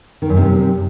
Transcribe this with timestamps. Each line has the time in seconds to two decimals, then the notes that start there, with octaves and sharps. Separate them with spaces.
0.22 D#3
0.29 F#2
0.37 C3